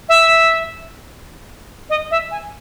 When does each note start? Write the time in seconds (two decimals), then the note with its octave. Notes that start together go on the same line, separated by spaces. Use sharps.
0.09 E5
1.90 D#5
2.11 E5
2.31 G#5